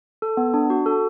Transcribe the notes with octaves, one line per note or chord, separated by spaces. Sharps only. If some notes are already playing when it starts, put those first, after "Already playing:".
A4
B3
D4
F#4
A4